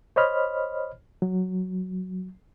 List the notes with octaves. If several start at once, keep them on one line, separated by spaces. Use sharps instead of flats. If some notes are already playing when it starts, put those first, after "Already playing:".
C5 C#5 D#5 B5 F6
F#3